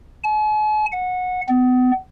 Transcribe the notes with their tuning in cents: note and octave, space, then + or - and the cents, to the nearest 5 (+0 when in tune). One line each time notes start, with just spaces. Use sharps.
G#5 +45
F#5 -20
B3 +35